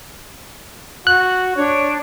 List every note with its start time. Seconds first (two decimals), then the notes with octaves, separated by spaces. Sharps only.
1.07 F#4 F#6
1.56 D4 C#5